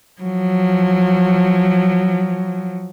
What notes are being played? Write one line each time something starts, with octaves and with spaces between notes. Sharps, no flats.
F3 F#3